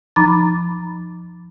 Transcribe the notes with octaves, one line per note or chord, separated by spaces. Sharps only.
F3 D#4 A#5 B5 D6 A6